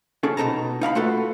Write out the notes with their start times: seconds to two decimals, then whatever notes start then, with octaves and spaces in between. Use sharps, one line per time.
0.23 C#4 G#4 A4
0.37 B2 D#4 A5 A#5
0.81 D#4 F5 A#5 B5
0.95 A3 F4 F#4 A4 B4